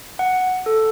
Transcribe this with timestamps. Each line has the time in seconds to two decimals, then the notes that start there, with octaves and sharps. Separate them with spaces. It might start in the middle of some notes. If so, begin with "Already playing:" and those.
0.19 F#5
0.66 A4